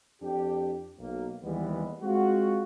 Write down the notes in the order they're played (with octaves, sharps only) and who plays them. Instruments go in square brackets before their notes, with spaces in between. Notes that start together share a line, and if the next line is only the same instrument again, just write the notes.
[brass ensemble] F2 D4 G4
B1 A#3
D#2 E3 G3 G#3 B3
G#3 C4 F4 F#4